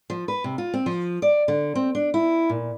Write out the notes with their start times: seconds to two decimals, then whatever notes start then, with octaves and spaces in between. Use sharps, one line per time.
0.10 F3
0.28 B4
0.44 C3
0.58 F4
0.74 C4
0.86 F3
1.22 D5
1.48 D3
1.75 C4
1.95 D4
2.14 E4
2.50 A#2